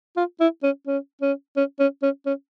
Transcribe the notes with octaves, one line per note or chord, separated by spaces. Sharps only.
F4
E4
C#4
C#4
C#4
C#4
C#4
C#4
C#4